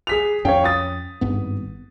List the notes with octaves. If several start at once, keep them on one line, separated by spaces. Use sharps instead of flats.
G#4 B6 F7
F2 C#4 C#5 F5 G5
D#6 A6
G#1 G2 B3